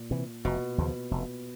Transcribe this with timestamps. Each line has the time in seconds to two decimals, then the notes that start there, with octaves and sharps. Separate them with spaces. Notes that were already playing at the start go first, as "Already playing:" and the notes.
Already playing: A#2
0.11 C3 E3
0.44 F1 B2
0.78 D#2 C#3 F3
1.11 F1